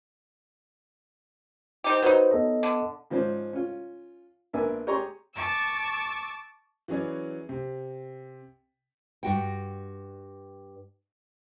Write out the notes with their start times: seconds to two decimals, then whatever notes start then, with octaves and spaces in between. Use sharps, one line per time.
1.84 C4 D#4 G4
2.03 F#3 D#4 F#4 B4 C5
2.31 B3 A4 D#5
2.63 D3
3.10 G#2 F3 C#4 C5 D5
3.53 C#4 F4
4.53 A#1 B3 D4 A#4 E5 G#5
4.87 G4 G#4 C#5 A#5 C6 C#6
5.35 A5 C#6 D6 E6
6.88 E3 F#3 C#4 G#4 D5
7.49 C3
9.23 G2 F#4 G5